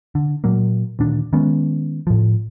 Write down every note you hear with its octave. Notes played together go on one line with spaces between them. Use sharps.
D3
A#2 F#3 A#3
D2 A#2 D#3 D4
D#3 G#3 B3 C#4
A2 F3